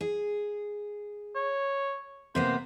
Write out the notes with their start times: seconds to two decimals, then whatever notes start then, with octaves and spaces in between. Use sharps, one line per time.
0.01 G#4
1.35 C#5
2.35 C3 A#3 B3 C5